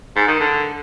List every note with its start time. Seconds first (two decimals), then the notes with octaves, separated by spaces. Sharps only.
0.16 G#2
0.28 D#3
0.40 D3